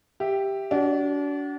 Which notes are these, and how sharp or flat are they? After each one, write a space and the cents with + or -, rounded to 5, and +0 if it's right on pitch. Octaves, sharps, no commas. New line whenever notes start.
G4 +0 E5 +0
D4 -35 F#4 +25